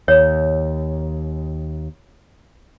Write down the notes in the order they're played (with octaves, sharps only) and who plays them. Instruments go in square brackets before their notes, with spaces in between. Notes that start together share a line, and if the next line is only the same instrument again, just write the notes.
[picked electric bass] D#2 [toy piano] C#5